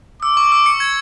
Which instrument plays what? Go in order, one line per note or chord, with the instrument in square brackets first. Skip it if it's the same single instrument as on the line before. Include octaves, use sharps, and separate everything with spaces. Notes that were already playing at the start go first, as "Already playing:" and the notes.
[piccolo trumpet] D6 [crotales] E6
[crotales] C#6
E6
C#7
G#6